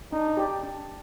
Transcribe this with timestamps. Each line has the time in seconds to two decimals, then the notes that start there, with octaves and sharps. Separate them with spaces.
0.12 D4 D#4
0.37 G4 D5
0.63 D4